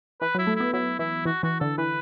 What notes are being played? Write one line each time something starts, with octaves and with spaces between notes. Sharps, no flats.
E3 B4
F#3
E4
A3
B3 E4
F#3 E4
E3 E4
E3 F#4
E3 F#4
D3 A4
E3 B4